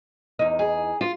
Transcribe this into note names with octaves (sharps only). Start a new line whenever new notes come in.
E2 D#4
G#4
F4